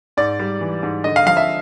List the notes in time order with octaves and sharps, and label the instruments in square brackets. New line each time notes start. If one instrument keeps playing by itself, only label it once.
[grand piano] G#2 D5
G3
E3
G#2
D3 D#5
F5
F3 F5
E5